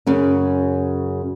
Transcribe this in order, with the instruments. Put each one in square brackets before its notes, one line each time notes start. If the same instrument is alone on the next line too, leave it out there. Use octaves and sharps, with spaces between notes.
[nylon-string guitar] F#2 C#3 C#4